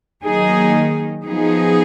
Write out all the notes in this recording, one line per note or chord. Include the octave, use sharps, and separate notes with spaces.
D#3 F#3 A#3 D#4 G#4
F3 B3 D#4 G#4